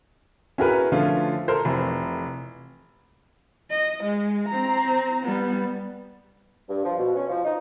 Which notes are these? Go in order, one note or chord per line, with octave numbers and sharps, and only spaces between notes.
C#4 E4 F#4 G#4 A#4 B4
D3 F3 A3 C#4 F4
A4 A#4 C5
F1 E3
D#5
G#3
C4 A#5
G3 B3
G2
F3
B2
C#4
F3
D#4